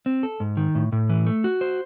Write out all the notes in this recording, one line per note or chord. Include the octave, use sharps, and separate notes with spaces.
C4
A4
G#2
D#3
A2
A2
E3
A3
F#4
C5